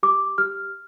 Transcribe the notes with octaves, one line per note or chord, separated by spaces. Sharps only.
G4 D6
G4 F6